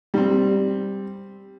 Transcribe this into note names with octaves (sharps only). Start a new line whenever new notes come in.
G3 C4